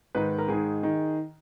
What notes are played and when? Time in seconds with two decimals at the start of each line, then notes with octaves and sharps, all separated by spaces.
0.15 G#2 D#3 B4
0.38 A#4
0.48 G#2 D#3 G#4
0.83 D#3